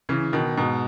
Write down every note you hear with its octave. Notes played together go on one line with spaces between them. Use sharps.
C#3 E3
B2 D#3
G#2 B2